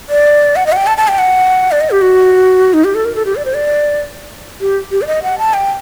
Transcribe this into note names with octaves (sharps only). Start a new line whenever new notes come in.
D5
F#5
D#5
F#5
G5
A5
A5
G5
F#5
D5
D#5
G4
F#4
D#4
G4
A4
A#4
A4
G4
D5
C5
D5
G4
G4
D5
D#5
F#5
A5
G5